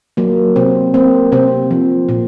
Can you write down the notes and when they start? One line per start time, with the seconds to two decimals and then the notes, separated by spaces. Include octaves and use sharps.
0.17 F#3 A#3
0.56 C3 C4
0.94 A#3 C4
1.32 C3 C4
1.71 F3
2.09 A#2